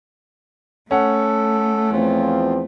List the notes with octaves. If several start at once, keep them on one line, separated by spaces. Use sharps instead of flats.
A3 C#4 A4 F#5
E2 F3 C4 F4